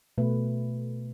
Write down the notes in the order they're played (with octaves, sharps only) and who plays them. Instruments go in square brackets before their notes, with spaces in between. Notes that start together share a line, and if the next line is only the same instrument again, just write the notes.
[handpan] B2 A3 B4